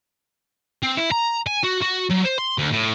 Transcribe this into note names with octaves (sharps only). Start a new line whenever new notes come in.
C4
E4
A#5
G#5
F#4
F#4
F#3
C5
C6
D2
A2